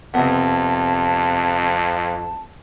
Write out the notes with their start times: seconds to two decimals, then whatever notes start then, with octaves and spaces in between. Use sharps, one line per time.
0.14 F2 C3 B3 A5